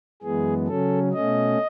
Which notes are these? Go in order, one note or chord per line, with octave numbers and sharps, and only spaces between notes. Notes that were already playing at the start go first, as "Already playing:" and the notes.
F#2 E3 G#3 B3 G#4
C#3 F#3 C#4 A4
B2 A3 C#4 D#5